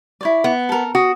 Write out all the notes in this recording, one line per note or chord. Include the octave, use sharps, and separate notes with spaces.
E4 C#5 D5
B3
A4 A#4
F#4 D#6